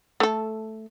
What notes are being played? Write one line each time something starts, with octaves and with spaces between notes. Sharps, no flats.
A3 A4